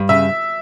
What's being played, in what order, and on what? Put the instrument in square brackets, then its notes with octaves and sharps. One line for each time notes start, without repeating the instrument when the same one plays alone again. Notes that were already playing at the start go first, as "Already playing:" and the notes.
Already playing: [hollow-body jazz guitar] G2
[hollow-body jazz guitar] C#3 [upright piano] E5